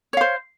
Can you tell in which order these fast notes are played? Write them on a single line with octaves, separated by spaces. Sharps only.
C#5 F5 C5